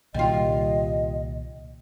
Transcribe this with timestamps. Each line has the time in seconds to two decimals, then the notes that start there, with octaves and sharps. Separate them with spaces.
0.14 C2 A#2 D#3 G3 F4 D#5